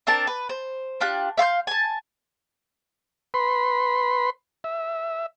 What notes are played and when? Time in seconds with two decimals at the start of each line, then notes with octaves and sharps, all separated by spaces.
0.07 C4 D4 A#4 A5
0.27 B4
0.49 C5
1.01 D4 F4 G4 F#6
1.37 E5 F5 C6 G6
1.67 G#5 A5
3.34 B4 B5 C6
4.64 E5